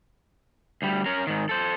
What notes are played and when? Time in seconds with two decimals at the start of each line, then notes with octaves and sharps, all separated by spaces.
0.82 D2 G3
1.06 C#4 A#4
1.27 G#2 D#3
1.49 A4 C5